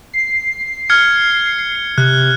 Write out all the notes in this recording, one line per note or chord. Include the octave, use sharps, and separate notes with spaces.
C7
F6 G#6 C#7
C3 F#6